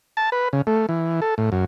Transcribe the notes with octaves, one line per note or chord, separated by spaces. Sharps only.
A5
B4
C#3
A3
E3
A4
A2
F#2